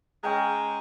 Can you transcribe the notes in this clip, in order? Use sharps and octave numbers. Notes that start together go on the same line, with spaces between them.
G#3 C#4 G5 A#5